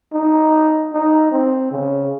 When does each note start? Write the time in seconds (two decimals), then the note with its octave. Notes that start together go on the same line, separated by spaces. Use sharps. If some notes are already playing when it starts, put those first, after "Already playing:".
0.13 D#4
0.93 D#4
1.32 C4
1.71 C#3